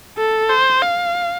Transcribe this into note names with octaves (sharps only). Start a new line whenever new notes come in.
A4
C5
F5